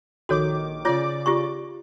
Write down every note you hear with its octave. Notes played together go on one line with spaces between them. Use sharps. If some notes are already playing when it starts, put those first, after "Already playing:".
A#1 D#3 F#4 A4 C#5 D6
C#3 F4 C#5 D5 D6
F4 G4 C#6